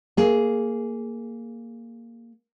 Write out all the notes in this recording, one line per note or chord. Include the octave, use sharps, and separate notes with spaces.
A#3 G#4